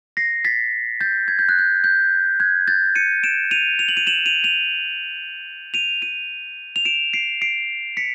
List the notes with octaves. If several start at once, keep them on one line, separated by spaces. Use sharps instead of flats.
A#6 C7
A6 B6
G6 A6
G#6
G6
F#6
G6
G6
F#6 G#6
G6 A6
C#7 D#7
D7 E7
D#7 F7
F7
F#7
D#7 F7
E7 F#7
D#7 F7
D#7 F7
D#7 F7
D#7 F7
F7
D7 E7
C7 D7
C7 D7
B6 C#7